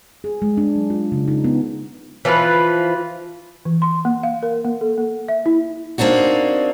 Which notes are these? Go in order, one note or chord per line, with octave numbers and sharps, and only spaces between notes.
G#4
G#3
D4
F#3
F4
C#3
D#4
B3
E3 F3 F4 B4
E3
C6
A#3
F5
A#4
A#3
A4
A#3
E5
E4
A#3 C4 D4 D#4 F#4